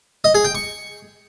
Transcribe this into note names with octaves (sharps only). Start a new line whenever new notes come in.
D#5
G#4
G5
C#6